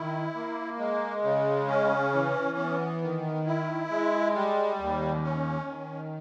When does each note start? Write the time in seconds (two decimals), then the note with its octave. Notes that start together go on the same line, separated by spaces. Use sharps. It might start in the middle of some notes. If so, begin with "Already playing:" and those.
Already playing: D#3 E4
0.35 A#3
0.79 G#3
1.23 C#3
1.68 C#4
2.13 E3
2.57 B3
3.02 D#3
3.46 E4
3.90 G#3
4.35 G3
4.80 D#2
5.23 C#4
5.68 D#3